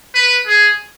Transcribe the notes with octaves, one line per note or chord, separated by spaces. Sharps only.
B4
G#4